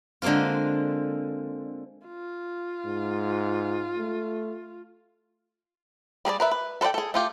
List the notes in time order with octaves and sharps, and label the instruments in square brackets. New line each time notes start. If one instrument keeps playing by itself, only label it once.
[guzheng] D3 G#3 A#3 C4 F4
[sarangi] F4
[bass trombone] G#2
A3
[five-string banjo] G3 G#4 A#4 D5
A#4 B4 E5
B4
A4 B4 C5 D5 G5
G#4 A4
A3 F4 G4